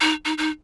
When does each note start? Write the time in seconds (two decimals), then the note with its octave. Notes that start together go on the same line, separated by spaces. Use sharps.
0.01 D#4
0.25 D#4
0.38 D#4